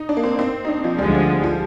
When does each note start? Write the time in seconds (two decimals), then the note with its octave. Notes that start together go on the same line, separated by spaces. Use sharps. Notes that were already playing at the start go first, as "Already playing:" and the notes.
Already playing: D#4
0.09 D4
0.17 A#3
0.23 C4
0.39 C4
0.65 D#4
0.68 D4
0.84 F3
0.99 D2 D3 F3 G3 G#3
1.15 G3
1.44 F3